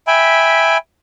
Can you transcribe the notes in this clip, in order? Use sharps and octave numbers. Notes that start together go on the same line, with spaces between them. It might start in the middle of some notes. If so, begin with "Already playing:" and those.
E5 G5 G#5 B5